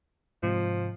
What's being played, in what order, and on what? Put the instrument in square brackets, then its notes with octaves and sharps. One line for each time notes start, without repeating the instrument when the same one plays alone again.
[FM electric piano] G#2 C3 [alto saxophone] F3